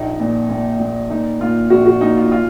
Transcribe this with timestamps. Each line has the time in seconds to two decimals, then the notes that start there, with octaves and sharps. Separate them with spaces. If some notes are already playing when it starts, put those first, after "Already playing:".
Already playing: A#1 D#4
0.20 A#2
0.49 A#2
0.80 A#2
1.10 A#2 D#4
1.40 A#2 F4
1.70 A#1 F#4
1.85 F#4
2.01 A#2 D#4
2.16 F4
2.31 F4